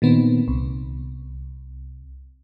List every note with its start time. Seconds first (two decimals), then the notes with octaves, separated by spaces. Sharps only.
0.02 A#2 D#3 B3 C4
0.48 C2